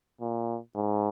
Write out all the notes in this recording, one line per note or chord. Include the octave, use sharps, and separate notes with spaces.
A#2
G#2